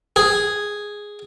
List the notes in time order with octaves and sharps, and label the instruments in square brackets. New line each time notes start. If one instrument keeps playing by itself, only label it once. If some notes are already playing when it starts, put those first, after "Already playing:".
[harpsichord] G#4